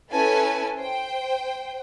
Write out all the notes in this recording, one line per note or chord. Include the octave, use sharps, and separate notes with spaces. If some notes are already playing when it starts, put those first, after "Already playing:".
C#4 E4 A4 B4 G#5 A5
C5 G5